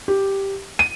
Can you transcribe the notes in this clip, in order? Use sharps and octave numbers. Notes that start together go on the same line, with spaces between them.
G4
D#7